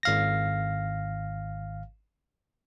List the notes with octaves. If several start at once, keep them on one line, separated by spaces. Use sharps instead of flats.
G#1 F5 A#6